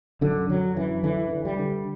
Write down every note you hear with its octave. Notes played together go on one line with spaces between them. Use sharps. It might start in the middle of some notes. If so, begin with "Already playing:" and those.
F#2 D3
D3 F#3
F#2 E3
D3 E3
D3
G3
D3